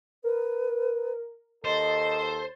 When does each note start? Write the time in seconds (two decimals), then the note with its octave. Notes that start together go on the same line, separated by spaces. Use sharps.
0.24 A#4 B4
1.65 D#2 A4 C5 D#5 A6